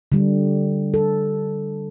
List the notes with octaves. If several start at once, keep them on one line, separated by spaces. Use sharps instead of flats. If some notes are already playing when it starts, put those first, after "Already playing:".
D3 G3
A4